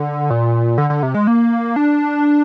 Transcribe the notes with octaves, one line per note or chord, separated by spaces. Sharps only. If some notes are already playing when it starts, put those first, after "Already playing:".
Already playing: D3
A#2
D3
D3
C3
G#3
A#3
D4